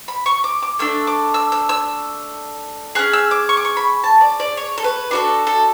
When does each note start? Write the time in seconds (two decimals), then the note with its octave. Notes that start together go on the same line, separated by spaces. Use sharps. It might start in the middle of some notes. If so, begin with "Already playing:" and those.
0.08 B5
0.26 C#6
0.44 D6
0.62 D6
0.79 A3 D4 A4 E6
1.07 D6
1.34 E6
1.52 E6
1.69 E6
2.95 C#4 G#4 F#6
3.13 E6
3.31 D6
3.49 C#6
3.57 D6
3.65 C#6
3.77 B5
4.04 A5
4.21 D5
4.40 D5
4.57 C#5
4.78 A4
4.84 B4
5.11 D4 F#4 A4 B4
5.47 A4